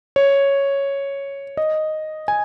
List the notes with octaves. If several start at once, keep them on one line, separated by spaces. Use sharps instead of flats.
C#5
D#5
G#5